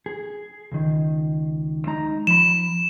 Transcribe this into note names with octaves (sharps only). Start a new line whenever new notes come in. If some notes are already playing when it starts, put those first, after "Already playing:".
G#4
C#2 D#3
G#3 D#4 A#5
F3 B5 E7